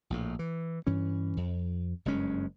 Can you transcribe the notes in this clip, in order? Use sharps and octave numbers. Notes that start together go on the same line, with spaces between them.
A#1 A2
E3
G2 E3 C#4
F2
F#1 G2 G#3 C#4